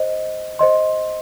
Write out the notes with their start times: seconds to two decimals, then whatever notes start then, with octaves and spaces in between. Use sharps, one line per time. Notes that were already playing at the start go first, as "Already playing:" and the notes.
Already playing: C5 D#5
0.59 C5 D#5 C6